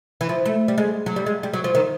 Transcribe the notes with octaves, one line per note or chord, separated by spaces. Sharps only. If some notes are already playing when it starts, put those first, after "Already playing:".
E3
F3
A3
G3
G#3
F#3
G3
G#3
G3
F#3
F3
D#3